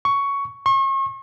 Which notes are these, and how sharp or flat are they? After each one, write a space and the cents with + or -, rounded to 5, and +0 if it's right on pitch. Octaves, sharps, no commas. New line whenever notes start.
C#6 +10
C#6 -40